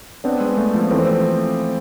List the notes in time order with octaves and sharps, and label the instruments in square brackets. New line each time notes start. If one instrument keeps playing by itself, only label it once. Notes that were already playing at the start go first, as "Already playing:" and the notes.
[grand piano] B3 D4 [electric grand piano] C4
[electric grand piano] G#3
A3
F3
[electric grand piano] E3 [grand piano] A3 C4